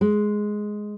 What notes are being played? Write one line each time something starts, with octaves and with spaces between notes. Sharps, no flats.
G#3